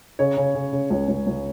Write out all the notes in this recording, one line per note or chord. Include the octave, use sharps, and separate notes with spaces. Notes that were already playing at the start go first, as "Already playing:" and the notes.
C#3 C#5
C#3
C#3
C#3
C#2
C#2
C#2